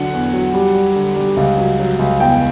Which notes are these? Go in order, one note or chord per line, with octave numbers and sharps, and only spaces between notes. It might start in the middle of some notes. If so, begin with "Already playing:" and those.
Already playing: D3 F#3 F#5
E2
F#3
G3
G3
D3
G3
C#2
F#3
F#3
C#2
E2 G5